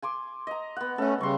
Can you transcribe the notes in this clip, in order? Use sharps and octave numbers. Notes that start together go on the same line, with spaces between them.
G#5 C6 D6
D#5 A#5
B3 F#5
A3 C#4 A4 F#5
C#3 G3 C6 C#6